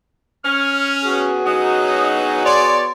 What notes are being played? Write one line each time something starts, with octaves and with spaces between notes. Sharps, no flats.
C#4 F6
B3 F#4 G#4
F#3 C#4 D#4 F#5 D#6
C#5 D5 C6